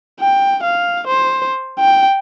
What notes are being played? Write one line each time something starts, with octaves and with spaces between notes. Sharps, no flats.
G5
F5
C5
G5